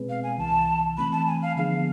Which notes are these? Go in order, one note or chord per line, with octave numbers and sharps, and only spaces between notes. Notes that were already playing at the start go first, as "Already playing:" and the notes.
Already playing: B2 G#3 C4 G#4 B4
F5
G#5
C2 C3 E3 A5
E3 A3 C4 B5
A5
G#5
F5
D3 F3 B3 D4 G#4 F5